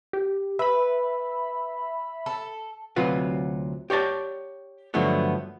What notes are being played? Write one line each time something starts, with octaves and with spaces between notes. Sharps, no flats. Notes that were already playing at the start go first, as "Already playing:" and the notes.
G4
B4 E5 B5
A4
D2 C3 F#3 F4 B4
G4 C#5 D5 A5
G2 D3 F3 F#3 A3 B3